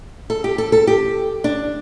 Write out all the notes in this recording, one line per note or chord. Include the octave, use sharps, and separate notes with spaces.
A4
G4
A4
A4
G4
D4